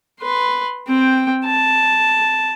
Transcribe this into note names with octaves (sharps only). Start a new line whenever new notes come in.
B4 C6
C4 G5
A5